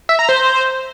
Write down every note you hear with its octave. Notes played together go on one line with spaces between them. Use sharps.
E5
A#5
C5